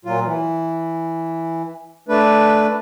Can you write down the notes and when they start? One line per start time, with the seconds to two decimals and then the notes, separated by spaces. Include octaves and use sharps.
0.05 A#2 F#3 F4
0.24 E3
2.09 A3 D4 B4